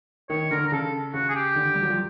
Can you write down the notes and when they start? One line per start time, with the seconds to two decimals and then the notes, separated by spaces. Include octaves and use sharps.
0.30 D#3 C#5
0.51 D3 A#4
0.67 A#4
0.72 C#3 A4
1.14 C#3 F#4
1.29 G#4
1.35 G4
1.55 D3
1.74 G3
1.82 F#3
1.90 F3